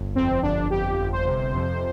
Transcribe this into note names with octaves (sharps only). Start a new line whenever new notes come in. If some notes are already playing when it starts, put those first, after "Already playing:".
Already playing: G1
F2 C4
G1 D4
F2 G4
G1
C5
C3
F2